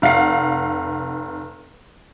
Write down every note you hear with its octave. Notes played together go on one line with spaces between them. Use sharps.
F1 F5 F#5 C7